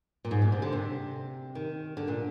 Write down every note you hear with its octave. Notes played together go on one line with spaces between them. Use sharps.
A#2
G#2
A#2
C3
D3
C3
D#3
D3
A#2